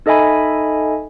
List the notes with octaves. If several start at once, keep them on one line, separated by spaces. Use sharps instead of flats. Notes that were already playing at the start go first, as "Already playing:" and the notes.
D#4 A4 D#5 E5 G#5 B5